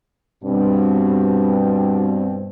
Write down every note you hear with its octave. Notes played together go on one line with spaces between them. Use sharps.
G2 B2 C4